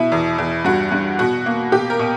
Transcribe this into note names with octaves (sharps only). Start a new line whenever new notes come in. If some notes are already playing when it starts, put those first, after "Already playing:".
Already playing: B2 E4
E2
E2
G2 F#4
G2
B2 F#4
A#3
B2 G4
A#4
B2